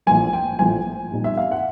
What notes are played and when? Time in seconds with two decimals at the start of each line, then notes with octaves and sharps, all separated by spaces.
0.06 A#1 A2 F3 G#5
0.33 G5
0.59 A#1 A2 F3 G#5
1.12 A#2 G3 C4 D#4
1.24 E5
1.37 F5
1.52 F#5